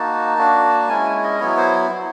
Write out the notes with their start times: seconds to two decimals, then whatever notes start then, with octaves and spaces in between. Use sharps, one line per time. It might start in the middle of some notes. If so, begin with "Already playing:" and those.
Already playing: A#3 D#4 F#4 A5
0.38 A#3 D4 F#4
0.89 G#3 C#4 E4 G#5
1.24 D#5
1.40 F#3 B3 E4 C#5
1.58 C5